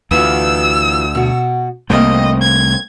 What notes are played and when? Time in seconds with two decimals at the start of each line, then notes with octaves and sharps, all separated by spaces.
0.11 D2 E3 F4 F#4 E6
1.15 B2 F#4
1.90 C2 C3 A3 A#3 C4 D#5 G5
2.42 G#6